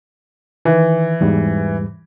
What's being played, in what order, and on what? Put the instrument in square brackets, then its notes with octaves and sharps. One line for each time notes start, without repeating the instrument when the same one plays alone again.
[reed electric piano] D#3 [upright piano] E3
[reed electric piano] E2 G#2 G3